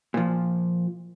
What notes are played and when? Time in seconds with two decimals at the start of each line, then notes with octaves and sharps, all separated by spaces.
0.14 A#2 F3